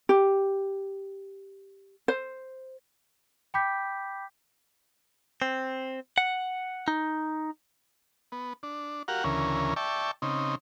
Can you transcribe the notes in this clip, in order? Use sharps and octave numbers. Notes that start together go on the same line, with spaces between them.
G4
C5
G5 B5 D6 G6 B6
C4
F#5
D#4
B3
D4
F#4 G4 A#4 F5 F#5
D2 C#3 E3 C#4 A#4
D5 E5 G5 A5 C#6
C#3 C4 D#4